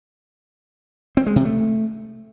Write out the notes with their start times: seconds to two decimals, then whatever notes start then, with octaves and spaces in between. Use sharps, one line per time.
1.17 C4
1.26 G#3
1.36 C3
1.45 A3